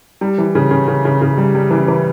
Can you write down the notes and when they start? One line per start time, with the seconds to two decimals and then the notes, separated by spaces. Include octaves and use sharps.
0.21 G3
0.38 E3
0.55 C#3
0.71 C#3
0.88 C#3
1.05 C#3
1.22 C#3
1.38 G3
1.55 G3
1.71 E3
1.88 E3